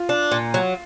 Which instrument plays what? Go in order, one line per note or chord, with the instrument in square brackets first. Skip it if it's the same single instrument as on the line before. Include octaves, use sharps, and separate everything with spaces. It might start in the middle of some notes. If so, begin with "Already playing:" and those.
Already playing: [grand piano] F4
[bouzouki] D4
A#2
F#3